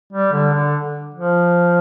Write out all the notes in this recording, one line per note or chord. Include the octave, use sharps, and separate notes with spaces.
G3
D3
D3
F3